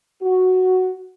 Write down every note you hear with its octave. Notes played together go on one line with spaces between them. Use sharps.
F#4